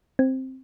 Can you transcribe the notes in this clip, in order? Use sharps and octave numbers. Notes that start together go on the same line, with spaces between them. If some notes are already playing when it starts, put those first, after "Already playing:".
C4